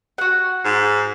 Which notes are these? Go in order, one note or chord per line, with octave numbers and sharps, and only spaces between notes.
F#4 F#5
G#2